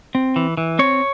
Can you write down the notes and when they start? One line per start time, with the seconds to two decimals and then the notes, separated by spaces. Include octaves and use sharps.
0.15 C4
0.36 E3
0.57 E3
0.79 C4 C#5